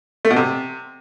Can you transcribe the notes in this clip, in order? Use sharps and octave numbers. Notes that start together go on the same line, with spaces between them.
A3
B2
C3